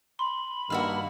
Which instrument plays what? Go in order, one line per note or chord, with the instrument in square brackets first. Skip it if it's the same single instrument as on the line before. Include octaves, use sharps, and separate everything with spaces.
[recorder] B5 [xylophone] C6
[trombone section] G2 D#3 A#3 [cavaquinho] F#4 E5 F5